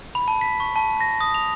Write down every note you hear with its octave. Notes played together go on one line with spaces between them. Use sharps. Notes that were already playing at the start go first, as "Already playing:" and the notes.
B5
A5
B6
C#6
A5
A#6
D#6
F7